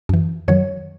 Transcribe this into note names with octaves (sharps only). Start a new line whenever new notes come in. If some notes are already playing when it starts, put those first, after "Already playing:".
F#2 E3
F#2 D#3 F#3 C#5